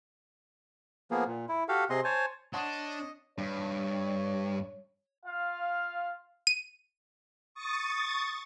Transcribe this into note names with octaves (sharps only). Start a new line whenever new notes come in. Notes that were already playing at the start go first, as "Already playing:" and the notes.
F3 A#3 B3 G#4
A#2
E4
F#4 G4 A4 F5
C3 C4 G#4 D#5 C6
C5 C#5 G#5 A5
D4 C#5 D#5 F#5 A5 C6
G2 C#5
F4 F5
D#7
C#6 D#6 A6